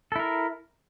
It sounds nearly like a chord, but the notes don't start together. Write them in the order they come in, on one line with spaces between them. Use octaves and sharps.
A4 E4 A#4